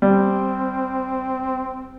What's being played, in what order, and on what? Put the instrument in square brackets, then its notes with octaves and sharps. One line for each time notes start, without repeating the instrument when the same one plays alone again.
[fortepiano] G3 [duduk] C4